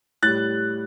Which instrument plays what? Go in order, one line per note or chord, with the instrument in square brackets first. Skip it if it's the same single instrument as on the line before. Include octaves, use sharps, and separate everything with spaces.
[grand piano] A2 G3 F#6 A6